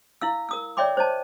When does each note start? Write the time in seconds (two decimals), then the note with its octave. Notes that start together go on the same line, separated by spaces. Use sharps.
0.21 E4 F5 E6
0.49 A#4 D#6 E6
0.77 C#5 D5 E5 G5 C6 D6
0.97 C5 C#5 D#5 A5